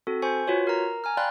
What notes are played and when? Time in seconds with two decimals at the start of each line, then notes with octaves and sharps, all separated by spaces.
0.07 C4 F#4 A4
0.22 C5 G#5 C#6 G6
0.48 F4 F#4 B4 C#5
0.67 A#4 A#5
1.04 G#5 A#5 F6
1.17 D5 F5 G5 B5 C6 F#6